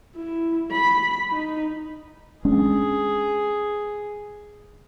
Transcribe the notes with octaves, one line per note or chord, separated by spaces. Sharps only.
E4
B5
D#4
G#3 C#4 D4 G#4